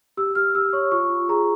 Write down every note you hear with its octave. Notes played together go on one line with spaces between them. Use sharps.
G4 E6
G4 F6
G4 E6
C#5 C#6
F4 C#6
F4
G#4 A#5